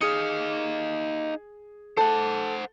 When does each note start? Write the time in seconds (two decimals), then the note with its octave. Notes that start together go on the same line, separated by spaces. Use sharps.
0.01 D#4 G#4 F5 D#6 C#7
1.97 A4 C5 F#5